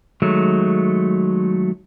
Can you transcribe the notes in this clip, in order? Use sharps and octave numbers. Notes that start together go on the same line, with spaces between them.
D#3 F#3 G#3 A3